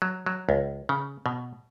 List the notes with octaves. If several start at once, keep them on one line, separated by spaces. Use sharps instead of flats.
F#3
F#3
C#2
C#3
B2